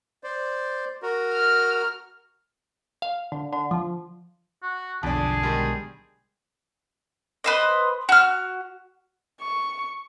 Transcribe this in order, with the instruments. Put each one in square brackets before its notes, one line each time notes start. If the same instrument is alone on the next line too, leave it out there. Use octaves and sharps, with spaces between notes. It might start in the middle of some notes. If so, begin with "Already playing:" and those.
[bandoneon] C5 D5
F#4 A#4
[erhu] F6
[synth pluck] F5
D3
D3
F3
[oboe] F#4
[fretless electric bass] B1 D3 [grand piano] F2 D4 [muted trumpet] G#4 [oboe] A5
[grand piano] D#3 G3 G#3
[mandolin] B4 C5 D#5
F#4 F6
[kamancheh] C#6